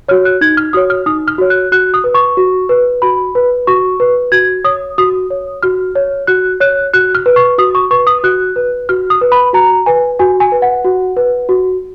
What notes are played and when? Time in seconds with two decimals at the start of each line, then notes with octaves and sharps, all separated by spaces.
0.08 F#4 C#5 F6
0.25 F#6
0.41 D#4 G#6
0.57 F6
0.73 F#4 C#5 D#6
0.90 F6
1.06 D#4 D#6
1.28 F6
1.38 F#4 C#5
1.50 F#6
1.72 F#4 F#6
1.94 D#6
2.04 B4
2.14 C#6
2.37 F#4
2.69 B4
3.02 F#4 B5
3.35 B4
3.67 F#4 C#6
4.00 B4
4.32 F#4 G#6
4.64 C#5 D#6
4.98 F#4 D#6
5.31 C#5
5.63 F#4 F6
5.95 C#5
6.27 F#4 F#6
6.61 C#5 F#6
6.94 F#4 F#6
7.15 F6
7.26 B4
7.36 C#6
7.58 F#4 D#6
7.75 C#6
7.91 B4 C#6
8.07 D#6
8.23 F#4 F#6
8.56 B4
8.89 F#4 F6
9.10 D#6
9.21 B4
9.32 B5
9.53 F#4 A#5
9.86 B4 G#5
10.19 F#4 G#5
10.40 G#5
10.52 B4
10.62 F#5
10.85 F#4
11.17 B4
11.49 F#4